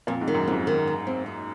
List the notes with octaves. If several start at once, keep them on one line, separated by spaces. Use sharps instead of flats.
F2 A#2
G#2
D#3
F#2
F2 G#2
D#3
D#4
C4
D#4